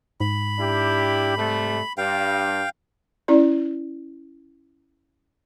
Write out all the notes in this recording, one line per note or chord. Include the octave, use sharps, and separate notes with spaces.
G#2 B5
D4 E4 G4
C3 G3 A3
G2 F5 G5
C#4 E4 D5